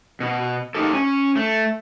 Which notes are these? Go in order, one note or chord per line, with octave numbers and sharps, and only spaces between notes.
B2
A#3 D#4 G4 A4
C#4
A3